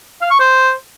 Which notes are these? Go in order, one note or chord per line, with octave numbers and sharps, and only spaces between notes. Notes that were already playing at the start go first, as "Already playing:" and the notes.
F5
C#6
C5